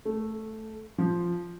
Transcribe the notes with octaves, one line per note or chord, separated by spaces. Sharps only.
A3
F3